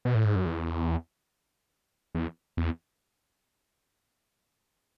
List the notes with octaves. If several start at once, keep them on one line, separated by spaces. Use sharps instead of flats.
B2
A2
G#2
F#2
E2
E2
E2